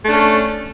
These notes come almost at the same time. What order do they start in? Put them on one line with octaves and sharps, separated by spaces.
A3 D4 C#4